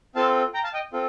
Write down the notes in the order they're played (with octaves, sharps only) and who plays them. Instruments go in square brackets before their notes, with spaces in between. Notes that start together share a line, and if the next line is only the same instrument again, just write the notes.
[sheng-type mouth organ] C4 F4 A4 F5 A5
G5 A#5
F5 A5
D#5 G5
C4 F4 A4